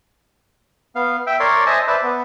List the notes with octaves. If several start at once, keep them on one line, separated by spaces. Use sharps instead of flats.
B3 F5
E5 G5
A#4 C#5 D5 C6
C5 D#5 E5 G#5 A5
B4 C5 D5 E5 A5
B3